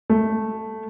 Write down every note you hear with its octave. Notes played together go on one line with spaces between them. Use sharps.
A3